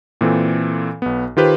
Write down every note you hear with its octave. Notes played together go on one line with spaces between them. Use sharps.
A#2 E3 C4 A4
B1 B3
D#3 F4 G4 B4 C5